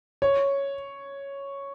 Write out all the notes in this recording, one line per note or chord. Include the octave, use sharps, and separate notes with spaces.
C#5